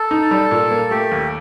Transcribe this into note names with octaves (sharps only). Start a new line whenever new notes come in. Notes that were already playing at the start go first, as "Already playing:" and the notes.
Already playing: A4
D#4
G3
A#2
A#3
A3 G4
D#2